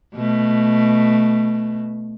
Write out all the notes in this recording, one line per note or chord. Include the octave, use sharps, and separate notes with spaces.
B2 A3